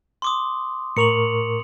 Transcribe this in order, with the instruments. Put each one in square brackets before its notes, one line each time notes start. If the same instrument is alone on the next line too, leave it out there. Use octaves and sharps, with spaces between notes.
[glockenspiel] C6 D6 D#6
[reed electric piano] A2 A#4 C#6 [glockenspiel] C#7 F7 F#7